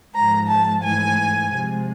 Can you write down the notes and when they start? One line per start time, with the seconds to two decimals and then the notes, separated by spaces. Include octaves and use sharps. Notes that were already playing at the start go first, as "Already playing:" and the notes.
0.14 G#2 F3 G#3 A#5
0.48 A5
0.82 G#2 E3 A3 G#5
1.51 C3 F3 G#3